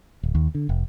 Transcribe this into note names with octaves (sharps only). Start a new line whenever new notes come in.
D1
D#2
D3
F1